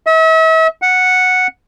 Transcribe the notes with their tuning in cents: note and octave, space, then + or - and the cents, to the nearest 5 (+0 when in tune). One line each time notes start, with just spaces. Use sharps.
E5 -40
F#5 -5